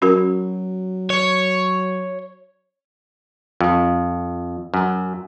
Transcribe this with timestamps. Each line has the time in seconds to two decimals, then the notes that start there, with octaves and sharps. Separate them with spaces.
0.02 F#3 C#4 F#4 A#4
1.10 C#5
3.61 F2
4.74 F#2